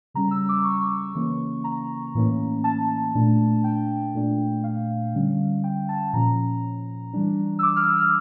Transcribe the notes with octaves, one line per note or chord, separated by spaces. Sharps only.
C#3 G3 C#4 A#5
E6
D6
C#6
C#3 E3 A#3 C#4
A#5
A2 E3 A#3 C#4
A5
A#2 A3 D4
G5
A#2 A3 D4
F5
D3 G3 C#4
G5
A5
A#2 F3 C#4 A#5
E3 G3 D4
E6
D6
F6
E6
F6